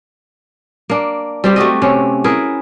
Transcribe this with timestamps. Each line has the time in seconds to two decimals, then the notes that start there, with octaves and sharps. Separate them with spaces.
0.90 A#3 D4
1.44 G3 C4 G4
1.56 A3 F#4 G4 D#5
1.82 C3 C4 C#4
2.24 E4 G#4 A#4 B4